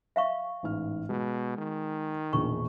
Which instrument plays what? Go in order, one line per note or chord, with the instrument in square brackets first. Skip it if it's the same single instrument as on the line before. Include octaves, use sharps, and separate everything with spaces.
[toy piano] E5 F5 C#6
[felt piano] A1 G#2 F6
[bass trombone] B2 [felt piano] G#3
[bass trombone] D#3
[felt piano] E1 A#1 [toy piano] C#6